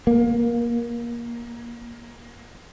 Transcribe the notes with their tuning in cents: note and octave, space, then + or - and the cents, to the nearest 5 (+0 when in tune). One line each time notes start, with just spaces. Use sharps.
A#3 +20